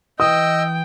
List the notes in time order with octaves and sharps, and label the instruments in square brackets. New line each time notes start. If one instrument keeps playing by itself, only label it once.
[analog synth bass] E3 [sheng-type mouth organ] D#5 E6 [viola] G5 [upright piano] D#6